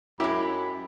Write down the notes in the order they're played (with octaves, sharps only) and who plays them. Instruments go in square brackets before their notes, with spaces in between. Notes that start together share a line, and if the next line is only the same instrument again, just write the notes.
[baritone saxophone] F#2 [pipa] G#3 G4 [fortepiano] E4 [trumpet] B5